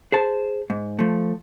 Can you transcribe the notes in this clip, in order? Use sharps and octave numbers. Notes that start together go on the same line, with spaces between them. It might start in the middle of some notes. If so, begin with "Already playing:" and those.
G#4 C5 A5
G#2
F3 A3